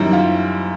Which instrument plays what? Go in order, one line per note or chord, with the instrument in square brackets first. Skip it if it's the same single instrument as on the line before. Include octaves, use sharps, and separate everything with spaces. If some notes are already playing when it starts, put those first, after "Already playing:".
Already playing: [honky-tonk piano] F#2 D#3 G3 E4
F4